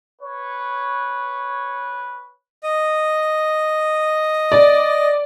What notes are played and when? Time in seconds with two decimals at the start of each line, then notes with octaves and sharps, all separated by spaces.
0.21 B4 C#5
2.63 D#5
4.52 D5